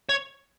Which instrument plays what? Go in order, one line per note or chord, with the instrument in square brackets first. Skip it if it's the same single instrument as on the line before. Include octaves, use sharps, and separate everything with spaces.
[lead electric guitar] C#5